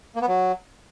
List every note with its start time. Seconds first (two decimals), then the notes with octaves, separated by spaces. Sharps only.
0.15 A#3
0.22 B3
0.28 F#3